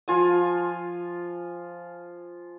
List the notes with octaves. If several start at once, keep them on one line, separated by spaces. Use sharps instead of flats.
F3 F4 G#5